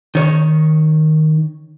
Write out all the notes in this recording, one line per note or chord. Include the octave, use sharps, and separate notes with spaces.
D#3 C#5